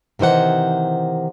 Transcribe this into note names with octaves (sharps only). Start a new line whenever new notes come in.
C3 D#3 E3 C5 F#5